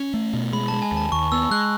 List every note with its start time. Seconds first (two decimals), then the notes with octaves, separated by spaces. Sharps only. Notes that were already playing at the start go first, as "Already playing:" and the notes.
Already playing: C#4
0.14 A3
0.34 B2
0.53 G#3 B5
0.68 A5
0.73 G#3
0.82 G#5
0.92 D#2
0.97 A5
1.12 D#2 C#6
1.32 B3 E6
1.51 G#3 F#6